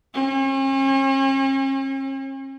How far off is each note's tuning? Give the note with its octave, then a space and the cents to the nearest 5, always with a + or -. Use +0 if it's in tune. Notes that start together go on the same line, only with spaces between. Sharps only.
C#4 -45